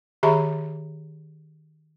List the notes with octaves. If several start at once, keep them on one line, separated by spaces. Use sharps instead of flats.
D#3 G4 G#4 E5 A#5 B5